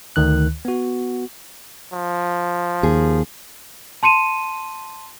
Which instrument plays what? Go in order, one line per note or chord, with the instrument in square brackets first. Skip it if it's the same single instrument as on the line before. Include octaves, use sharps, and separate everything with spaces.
[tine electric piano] D2 D#3 F#6
B3 F#4
[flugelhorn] F3
[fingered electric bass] D#2 [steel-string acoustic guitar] G#4
[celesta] A5 C6 C#7 D#7 E7